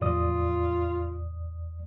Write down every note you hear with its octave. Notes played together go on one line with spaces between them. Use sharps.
E2 A2 C3 F3 F4 D5 D#6